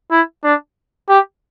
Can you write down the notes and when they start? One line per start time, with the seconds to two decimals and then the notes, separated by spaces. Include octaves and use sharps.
0.11 E4
0.44 D4
1.09 G4